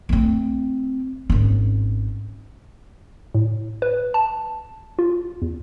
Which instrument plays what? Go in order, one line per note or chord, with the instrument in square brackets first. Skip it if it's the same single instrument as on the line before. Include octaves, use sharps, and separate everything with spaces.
[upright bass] A3 C4
G#1 C#4
[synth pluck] A2
B4
A5
F4
E2